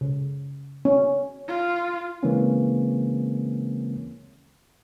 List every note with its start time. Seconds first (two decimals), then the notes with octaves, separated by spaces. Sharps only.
0.01 C#3
0.85 C#4
1.48 F4
2.23 C#3 E3 G#3 A#3 C4 C#4